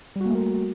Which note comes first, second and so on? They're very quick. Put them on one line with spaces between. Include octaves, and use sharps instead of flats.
G3 F#4 A#3 A3 A#4